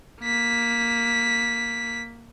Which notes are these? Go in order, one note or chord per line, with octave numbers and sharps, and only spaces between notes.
A#3 B6